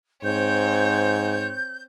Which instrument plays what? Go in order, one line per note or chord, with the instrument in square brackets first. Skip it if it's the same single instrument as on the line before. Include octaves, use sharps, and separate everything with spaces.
[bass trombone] G#2 [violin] C4 C#5 [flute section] G6